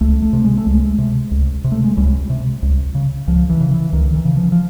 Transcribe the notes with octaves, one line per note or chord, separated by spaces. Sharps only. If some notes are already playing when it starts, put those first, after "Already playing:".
C#2 A3
A3
C3
G#3
A3
C#2 G#3
C3
C#2
C3
A3
G#3
C#2 G3
C3
C#2
C#3
C#2 F3
E3
C#3
E3
C#2 D#3
E3
C#3
F3
F3